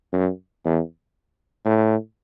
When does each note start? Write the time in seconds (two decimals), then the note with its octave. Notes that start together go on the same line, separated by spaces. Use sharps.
0.13 F#2
0.64 E2
1.65 A2